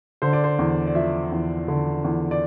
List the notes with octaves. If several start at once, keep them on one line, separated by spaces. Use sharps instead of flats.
D3 C5
D5
C5
E2
D5
F3 E5
E2
D3
E2
D5